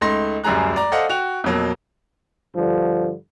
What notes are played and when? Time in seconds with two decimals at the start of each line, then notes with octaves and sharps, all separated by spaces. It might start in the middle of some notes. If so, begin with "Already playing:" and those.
0.01 C#2 A3 D#4 C6 A#6
0.44 D1 F#2 G3 G#4 A#5 F#6
0.76 D5 A#5
0.92 A4 C5 D5 D#5 F5 F#5
1.09 F#4 G5 F7
1.44 F2 B2 F#3 A#3
2.55 G2 D3 F3